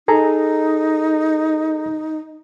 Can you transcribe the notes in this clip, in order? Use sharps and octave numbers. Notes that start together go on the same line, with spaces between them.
D#4 G#4 A4 A#5